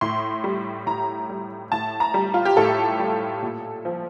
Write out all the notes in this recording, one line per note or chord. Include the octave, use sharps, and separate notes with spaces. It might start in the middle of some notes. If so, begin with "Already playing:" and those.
A2 C6
G3
A2 A#5
G3
A2 A5
A#5
G3
F4
G4
A2 A4
G3
A#2
F3